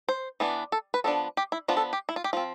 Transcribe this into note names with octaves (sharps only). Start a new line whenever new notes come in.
C5
E3 B3 D4
A4
B4
F3 B3 D4 A4
G4
E4
F3 B3 D4 F4
A4
G4
E4
F4
G4
F3 C4 F4